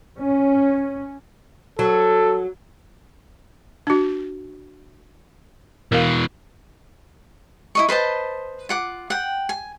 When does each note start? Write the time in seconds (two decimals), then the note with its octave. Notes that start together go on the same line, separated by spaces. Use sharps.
0.19 C#4
1.79 F#3 A4
3.87 D4 F#4
5.92 B2 E3 A#4 F5
7.75 E4 D#5 C#6
7.89 B4 C5 D#5 A5
8.69 F4 F#5 D6
9.10 F#5 G5
9.49 G#5